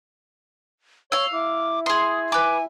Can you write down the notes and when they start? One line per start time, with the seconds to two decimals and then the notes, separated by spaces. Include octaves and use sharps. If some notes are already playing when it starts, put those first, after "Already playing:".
1.12 C#5 F5 E6 G7
1.33 E4 D6
1.86 G#4 C6 D#6
2.32 B4 G#5 D6